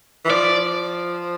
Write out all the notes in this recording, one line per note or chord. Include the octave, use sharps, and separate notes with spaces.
E3
F3 D5